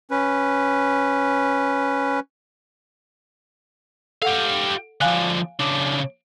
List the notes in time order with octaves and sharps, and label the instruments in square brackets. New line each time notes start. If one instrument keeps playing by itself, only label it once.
[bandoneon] C#4 B4
[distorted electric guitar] G4 F5 [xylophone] A4 F#5
[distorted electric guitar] D3 F3 [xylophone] F5 G#5 F#6
[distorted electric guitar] C#3 D4